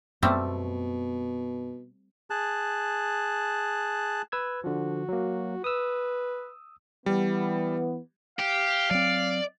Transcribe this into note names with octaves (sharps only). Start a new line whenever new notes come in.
F#2 B2 G3 A3 B3 C4
G#4 A5 F#6
B4 E6 G#6
D3 F3 F#4
F#3 A#3
B4 D#6 E6
E3 G3 B3
G4 F5
F#3 C4 D5